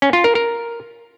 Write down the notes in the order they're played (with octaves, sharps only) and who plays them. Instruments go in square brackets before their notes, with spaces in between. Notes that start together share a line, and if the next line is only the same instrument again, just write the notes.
[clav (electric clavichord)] C#4
F4
A#4
A#4